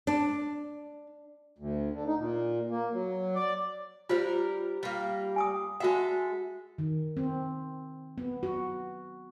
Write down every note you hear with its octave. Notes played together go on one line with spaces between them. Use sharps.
D4
D2
D3
D#4
A#2
A#3
F#3
D5
G3 F4 A#4 C5
G3 A#3
G#5 D6 D#6
G#3 F#4 A4 E5 F#5
D#3
C4
B3
F#4